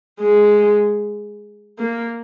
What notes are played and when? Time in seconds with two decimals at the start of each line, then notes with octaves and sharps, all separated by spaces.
0.20 G#3
1.79 A#3